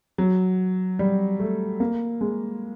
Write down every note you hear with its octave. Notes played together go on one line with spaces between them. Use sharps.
F#3
G3
A3
A#3
G#3